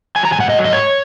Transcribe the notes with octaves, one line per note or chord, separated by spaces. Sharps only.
F#3 G#5
A#5
G#2 G#5
F#5
F#3 D#5
G#2 D#5
C#5